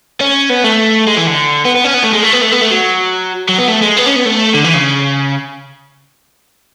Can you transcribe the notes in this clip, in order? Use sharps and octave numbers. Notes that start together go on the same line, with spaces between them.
C#4
B3
A3
G#3
E3
D3
B3
B3
C#4
B3
A3
G#3
A3
B3
A3
B3
A3
F#3
F#3
B3
A3
G#3
B3
C#4
B3
A3
D3
E3
C#3